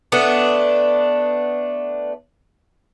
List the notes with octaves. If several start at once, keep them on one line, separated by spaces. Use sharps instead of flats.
A3 B3 D4